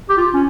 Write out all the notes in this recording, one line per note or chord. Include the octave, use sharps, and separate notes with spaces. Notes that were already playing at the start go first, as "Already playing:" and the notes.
G4
F4
C#4